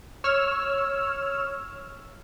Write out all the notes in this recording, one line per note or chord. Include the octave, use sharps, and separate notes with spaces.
C#5 E6 F6